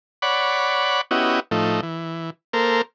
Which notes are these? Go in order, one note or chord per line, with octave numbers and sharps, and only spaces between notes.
C#5 D5 F#5 B5
B3 C#4 E4 F#4 G4 D#5
A2 F3 A3 D#4
E3
A#3 A4 A#4 C5